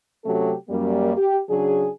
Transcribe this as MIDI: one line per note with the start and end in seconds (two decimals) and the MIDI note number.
0.25 0.53 48
0.25 0.53 54
0.25 0.53 57
0.25 0.53 61
0.25 0.53 67
0.25 0.53 69
0.70 1.12 42
0.70 1.12 55
0.70 1.12 58
1.17 1.38 67
1.50 1.87 49
1.50 1.87 54
1.50 1.87 62
1.50 1.87 68